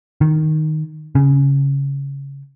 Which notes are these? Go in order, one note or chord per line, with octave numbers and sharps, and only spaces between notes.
D#3
C#3